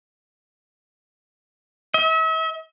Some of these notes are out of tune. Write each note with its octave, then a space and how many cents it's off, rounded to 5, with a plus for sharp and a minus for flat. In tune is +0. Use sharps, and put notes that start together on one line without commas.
E5 -40